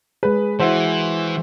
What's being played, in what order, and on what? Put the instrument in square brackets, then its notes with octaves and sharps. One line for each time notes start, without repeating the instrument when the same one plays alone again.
[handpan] G#3 G#4 [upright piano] B4
[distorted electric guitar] E3 [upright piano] E4 F#4 C5